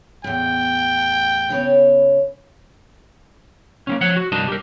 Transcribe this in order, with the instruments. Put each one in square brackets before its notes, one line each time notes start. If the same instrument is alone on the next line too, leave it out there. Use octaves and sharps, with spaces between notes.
[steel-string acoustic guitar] E2 A2 [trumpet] G5
[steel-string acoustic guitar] C#3 B3 C#5
[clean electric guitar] A#3 C4 C#4
F3 C#5 F#5
F#4
C2 G2 D4 A#4 D#5 A5
G4 A#4